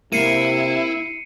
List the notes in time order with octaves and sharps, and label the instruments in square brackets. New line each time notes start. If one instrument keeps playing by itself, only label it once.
[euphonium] C3 [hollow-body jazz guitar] A#3 [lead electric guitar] E4 [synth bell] C7 C#7 D#7